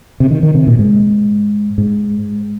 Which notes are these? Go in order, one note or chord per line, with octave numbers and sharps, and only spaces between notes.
C3
D#3
D#3
C3
A#2
G#2
G#2